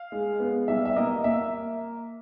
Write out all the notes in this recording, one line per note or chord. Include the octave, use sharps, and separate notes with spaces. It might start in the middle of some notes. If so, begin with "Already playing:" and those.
Already playing: F5
G#3
B3
G3 E5
E5
A#3 D#5
A#3 E5